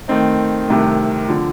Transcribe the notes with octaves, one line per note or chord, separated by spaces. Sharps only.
D#3 A3 C4 D#4
C2 C3 D#3 A3
D3 F3